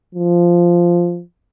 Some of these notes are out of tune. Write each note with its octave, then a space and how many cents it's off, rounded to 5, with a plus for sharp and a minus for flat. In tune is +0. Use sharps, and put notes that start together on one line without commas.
F3 -5